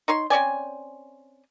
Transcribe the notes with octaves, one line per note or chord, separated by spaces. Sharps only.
D#4 C#5 C6
C4 C#4 D5 G#5